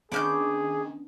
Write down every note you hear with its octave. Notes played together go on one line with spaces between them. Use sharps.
D#3 B3 C#4 D4 G#4 D6 F6 G6